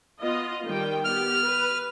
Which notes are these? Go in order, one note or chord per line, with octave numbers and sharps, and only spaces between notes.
B3 F4 D#5
D#3 G3 G5
B3 G4 F6
B4